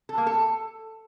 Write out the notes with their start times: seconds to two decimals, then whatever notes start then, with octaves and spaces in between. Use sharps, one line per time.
0.09 A4
0.18 A#3
0.27 A4